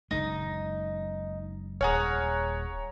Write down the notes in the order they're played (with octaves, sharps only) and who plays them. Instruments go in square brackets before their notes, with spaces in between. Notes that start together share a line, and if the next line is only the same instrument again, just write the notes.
[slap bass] F#1 G#3 [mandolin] D#4
[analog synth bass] D#1 [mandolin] G#4 F#5 F6 [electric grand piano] C#5 G#5 A#5